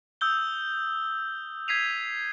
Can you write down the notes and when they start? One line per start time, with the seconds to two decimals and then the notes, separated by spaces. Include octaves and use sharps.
0.21 D#6 E6 G6 G7
1.68 G#6 B6 C7 D#7 F7